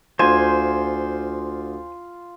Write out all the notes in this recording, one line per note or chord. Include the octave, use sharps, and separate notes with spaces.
D2 F4 C5 G#5